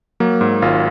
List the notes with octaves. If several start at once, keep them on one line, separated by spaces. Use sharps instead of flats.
F#3 A#3
G#2
G#1 F4